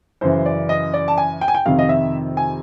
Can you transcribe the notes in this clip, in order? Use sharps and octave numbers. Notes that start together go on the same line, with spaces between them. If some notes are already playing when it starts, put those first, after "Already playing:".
F#2 C#3 E3 C5
D5
D#5
D5
A5
G#5
G5
G#5
G5
F2 C3 D#3 F5
D#5
E5
G#5